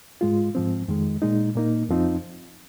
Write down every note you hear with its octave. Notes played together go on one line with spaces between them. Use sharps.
G#2 G#3 F4
G#2 F3 C4
F2 D#3 G#3
A#2 G#3 D#4
A#2 A#3 D#4
F2 F3 C4 D#4